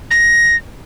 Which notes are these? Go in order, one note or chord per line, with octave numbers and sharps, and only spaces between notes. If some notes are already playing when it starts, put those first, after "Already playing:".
A#6